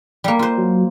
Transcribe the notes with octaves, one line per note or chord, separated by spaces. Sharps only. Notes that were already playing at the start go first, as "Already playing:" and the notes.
G3 A#3
F4 C5
F#3